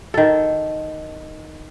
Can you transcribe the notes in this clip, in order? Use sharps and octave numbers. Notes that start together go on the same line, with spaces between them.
D#3 A4